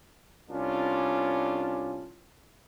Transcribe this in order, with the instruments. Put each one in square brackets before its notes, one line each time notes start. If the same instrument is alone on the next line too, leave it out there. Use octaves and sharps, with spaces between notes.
[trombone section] C2 C#4 D4 F4